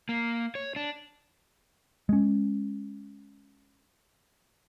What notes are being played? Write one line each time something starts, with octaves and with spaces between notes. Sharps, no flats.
A#3
C#5
D4
G#3 C#4